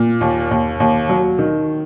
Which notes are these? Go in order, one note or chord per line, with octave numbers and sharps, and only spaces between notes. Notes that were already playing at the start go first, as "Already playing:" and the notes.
Already playing: A#2
D#2
D#2
D#2
F#3
D#3